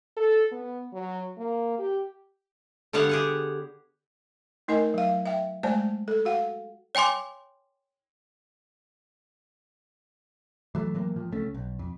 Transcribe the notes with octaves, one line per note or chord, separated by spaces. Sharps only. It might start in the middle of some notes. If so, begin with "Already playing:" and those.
A4
B3
F#3
A#3
G4
D3 G3 B3 C#5 F5 F#5
G4 G#4 F#5
A3 D#4 A#4 D#5 G#5
F#3 F5
E5 G5
G#3 A3 C5 D5 G#5 A5
A4
F#4 F5 F#5
C#5 G5 G#5 C6 D6
E3 F#3 A3
A2 E3 F#3 A#3
A2 F3
C#2 A3 C#4
B1
F2